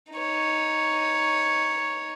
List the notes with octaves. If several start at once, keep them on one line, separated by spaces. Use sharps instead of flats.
D#4 C#5